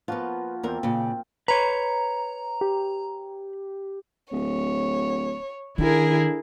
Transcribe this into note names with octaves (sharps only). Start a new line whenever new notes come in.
F3 A#3 B3 F4 F#4
E2 A#3 C4 A#4 G5
A#2 C#3
B4 C#5 A#5
G4
D1 C#5
D3 D#3 E4 G#4 A#4